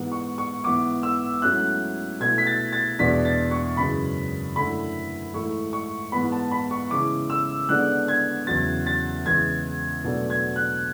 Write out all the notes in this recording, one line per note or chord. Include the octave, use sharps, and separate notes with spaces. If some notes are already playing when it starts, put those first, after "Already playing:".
Already playing: G#2 E3 B3
C#6
C#6
G#2 E3 B3 E4 D6
E6
G#2 F#3 A3 C#4 E4 F#6
B2 A3 E4 G#6
B6
A6
A6
E2 B2 G#3 D4 B6
A6
C#6
F#2 C#3 E3 G#3 B5
F#2 D3 A3 E4 B5
G#2 E3 A3 E4 C#6
C#6
G#2 E3 B3 B5
A5
B5
C#6
C#3 E3 G#3 C#4 E4 D6
E6
D3 G#3 B3 D4 F#6
G#6
E2 C#3 F#3 A6
A6
E2 C#3 E3 G#3 G#6
B2 F#3 A3 D4
G#6
F#6